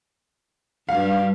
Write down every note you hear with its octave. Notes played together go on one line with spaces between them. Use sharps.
G2 G3 F5